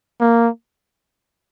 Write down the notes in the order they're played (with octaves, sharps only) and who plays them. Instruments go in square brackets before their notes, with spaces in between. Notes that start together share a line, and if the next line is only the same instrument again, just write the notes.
[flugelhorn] A#3